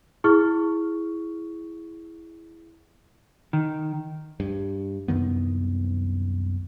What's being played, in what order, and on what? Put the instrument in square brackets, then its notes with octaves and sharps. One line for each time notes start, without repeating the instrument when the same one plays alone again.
[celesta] E4 G#4 C#6 F6
[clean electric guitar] D#3
[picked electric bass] G2
C2 F#2 D#3 B3